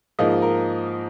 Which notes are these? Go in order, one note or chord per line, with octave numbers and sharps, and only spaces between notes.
G#2 F3 A#3 D#5
A#4